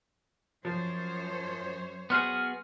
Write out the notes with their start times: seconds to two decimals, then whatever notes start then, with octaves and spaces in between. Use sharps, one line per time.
0.65 F#2 F3 C5 C#5
2.10 B3 F#4 G#4 C6 F6